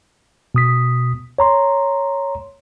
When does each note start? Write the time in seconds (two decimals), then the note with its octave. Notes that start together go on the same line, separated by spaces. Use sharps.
0.55 B2 D#6 B6
1.39 C#5 A#5 C6